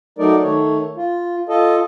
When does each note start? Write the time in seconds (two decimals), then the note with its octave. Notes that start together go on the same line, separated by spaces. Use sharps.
0.19 F#3 A3 D#4 A#4 D5
0.43 D#3 A3 C#5
0.97 F4
1.49 F4 A4 D#5